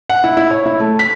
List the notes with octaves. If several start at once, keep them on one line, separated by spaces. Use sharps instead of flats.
F#5
E4
E4
C#5
E4
A3
B6